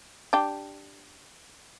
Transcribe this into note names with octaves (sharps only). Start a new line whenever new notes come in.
D4 G4